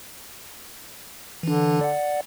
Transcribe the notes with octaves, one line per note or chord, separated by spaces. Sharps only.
D3 E3 D4
D5 F#5